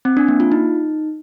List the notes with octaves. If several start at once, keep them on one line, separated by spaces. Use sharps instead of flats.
C4
D4
A#3
F4
D#4